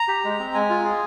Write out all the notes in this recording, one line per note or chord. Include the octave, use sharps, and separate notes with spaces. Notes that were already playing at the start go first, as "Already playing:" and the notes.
Already playing: A#5
G4
G#3
C4
G#3 G#5
F4
G#4